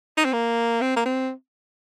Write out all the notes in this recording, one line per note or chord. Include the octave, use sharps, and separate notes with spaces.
D#4
C4
A#3
C4
A#3
C4